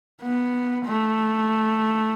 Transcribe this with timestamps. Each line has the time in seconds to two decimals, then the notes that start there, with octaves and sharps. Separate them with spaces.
0.22 B3
0.85 A3